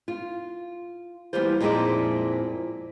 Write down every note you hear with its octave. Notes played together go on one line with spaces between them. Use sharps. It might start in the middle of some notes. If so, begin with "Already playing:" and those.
F4
E3 G3 A#3 B3 F4 C5
F2 A#2 G#3 D#4 E4 D5